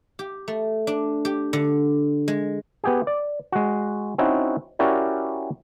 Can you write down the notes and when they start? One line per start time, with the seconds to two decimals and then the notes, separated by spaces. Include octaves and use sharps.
0.19 G4
0.48 A3
0.87 D4
1.25 G4
1.53 D3
2.28 G#3
2.84 B3 G4 G#4
3.07 D5
3.52 G#3 F#4
4.18 C4 C#4 D#4 E4 F#4
4.79 C#4 E4 F#4 G4 A#4 D5